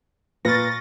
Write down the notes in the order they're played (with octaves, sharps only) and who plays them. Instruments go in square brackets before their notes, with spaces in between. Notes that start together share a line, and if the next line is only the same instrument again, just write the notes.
[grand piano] A#2 [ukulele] B4 [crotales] C#6 F6 C#7 [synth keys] A6 A#6